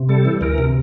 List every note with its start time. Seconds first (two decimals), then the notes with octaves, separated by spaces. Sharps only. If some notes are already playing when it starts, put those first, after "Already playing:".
Already playing: C3
0.09 G3 A4
0.25 E3
0.41 D2 A#4
0.58 C3